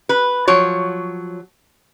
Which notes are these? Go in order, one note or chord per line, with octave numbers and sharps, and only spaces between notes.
B4
F3 F#3 C#5